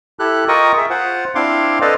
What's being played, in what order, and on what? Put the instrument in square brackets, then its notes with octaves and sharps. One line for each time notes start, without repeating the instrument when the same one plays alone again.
[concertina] E4 G4 A4 F#6
F4 A#4 D#5 G5 C#6 D#6
G#4 E5
F4 C5 F#5
C4 D4 E4 F5 C6 D6
A4 B4 C5 D5 D#5 F5